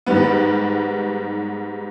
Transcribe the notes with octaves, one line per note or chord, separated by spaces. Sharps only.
G#2 D#3 G3 B3